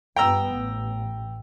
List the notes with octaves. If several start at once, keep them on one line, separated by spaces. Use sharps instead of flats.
G2 B3 G5 A#5 E6
A1